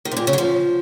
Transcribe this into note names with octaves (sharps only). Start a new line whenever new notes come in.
D#3
C3
A#2
C#3
F#3
F3